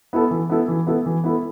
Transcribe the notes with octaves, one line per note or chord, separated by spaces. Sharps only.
B3 E4 A4
E3
B3 E4 A4
E3
B3 E4 A4
E3
B3 E4 A4